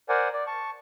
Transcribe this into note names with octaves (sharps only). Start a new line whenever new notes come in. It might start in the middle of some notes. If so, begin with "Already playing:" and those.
A#4 C5 D5 F#5 G#5
D5
A5 C#6